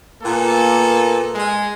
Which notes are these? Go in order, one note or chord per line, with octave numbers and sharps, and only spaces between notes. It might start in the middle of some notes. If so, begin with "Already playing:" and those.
A#2 A#3 B3 A4
G#3